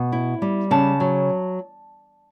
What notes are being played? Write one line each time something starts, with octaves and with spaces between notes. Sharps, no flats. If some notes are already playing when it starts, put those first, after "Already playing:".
Already playing: B2
E4
G3
C#3 A5
F#3